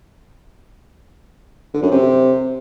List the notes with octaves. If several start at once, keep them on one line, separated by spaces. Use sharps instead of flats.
D3
F#2
C3